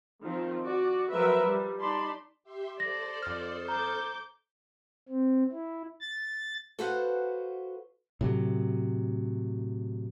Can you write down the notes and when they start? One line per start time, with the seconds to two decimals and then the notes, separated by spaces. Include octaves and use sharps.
0.22 D#3 F3 C4 F4
0.64 F#4 D5
1.12 F3 F#3 A#4 B4 E5
1.46 G3
1.80 D#4 D5 A5 B5 C6
2.43 G4 E5 C6
2.80 A4 C5 D5 C6 A#6
3.22 F2 D#6 F6
3.68 A#5 D6 G6
5.08 C4
5.52 E4
6.01 A6
6.79 F#4 A4 B4 C5 F5 F#5
8.21 A2 C3 F#3